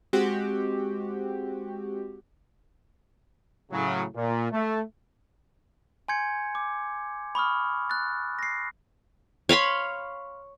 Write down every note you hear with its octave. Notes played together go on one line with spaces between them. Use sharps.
G#3 C4 F#4 G4
A2 C#3 F#3
A#2
A3
G#5 C6 G6 G#6 C#7
D6
B5 C#6 D#6 F6
F#6 A6
A#6 C7
C#5 F5 B5 C6